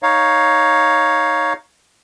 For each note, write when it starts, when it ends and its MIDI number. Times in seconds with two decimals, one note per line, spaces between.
0.03 1.53 63
0.03 1.53 73
0.03 1.53 77